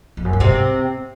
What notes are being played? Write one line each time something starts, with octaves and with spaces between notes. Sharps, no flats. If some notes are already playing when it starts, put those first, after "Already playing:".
F2
F#2
G2
G#2 C3 C4